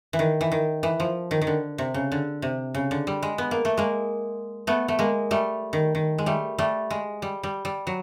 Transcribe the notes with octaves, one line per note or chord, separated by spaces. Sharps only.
E3
D#3
E3
D#3
E3
F3
D#3
D#3
D3
C3
C#3
D3
C3
C#3
D3
G3
G#3
B3
A#3
A3
G#3 A#3
A3 B3
A3
G#3 A#3
G3 A3
D#3
D#3
G#3
G3 A3
G3 A3
G#3
G3
G3
G3
F#3